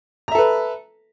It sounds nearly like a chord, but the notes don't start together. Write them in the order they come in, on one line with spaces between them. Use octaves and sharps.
A#5 E5 A4 B4